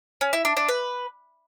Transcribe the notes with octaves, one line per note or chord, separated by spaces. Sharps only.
C#4
E4
D4
D4
B4